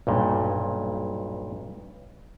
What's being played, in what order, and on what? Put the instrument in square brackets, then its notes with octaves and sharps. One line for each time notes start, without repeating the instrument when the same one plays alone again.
[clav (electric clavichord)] B1 G2 A#2